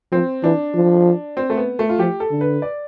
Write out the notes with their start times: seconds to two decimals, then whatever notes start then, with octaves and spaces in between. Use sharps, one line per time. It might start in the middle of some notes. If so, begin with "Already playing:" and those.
0.12 F3 C4
0.43 E3 D4
0.75 F3
1.37 C4
1.50 A3
1.57 B3
1.79 A3
1.89 F4
1.99 F3 G4
2.20 A4
2.31 D3
2.41 B4
2.62 D5